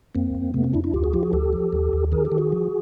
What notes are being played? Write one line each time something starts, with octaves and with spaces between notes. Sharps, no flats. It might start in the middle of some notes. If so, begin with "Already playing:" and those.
F2 A#3 C4
F2
C3 A3 B3
A#3 C4
F2 D4 E4
D4 E4
D2 F4 G4
F#4 G#4
F3 F4 G4
F#4 G#4
D2 G4 A4
F3
D#2
D#2
D#3 G#4 A#4
G4 A4
D#3
F#4 G#4
F3